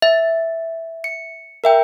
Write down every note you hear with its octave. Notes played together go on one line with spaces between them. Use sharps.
E5
C#7
A#4 E5 G5